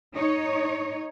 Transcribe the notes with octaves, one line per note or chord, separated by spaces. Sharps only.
D#4 C#5